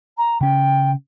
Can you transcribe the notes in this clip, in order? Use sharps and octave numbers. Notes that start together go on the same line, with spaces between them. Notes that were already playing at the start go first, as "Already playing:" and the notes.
A#5
C#3 C#4 G5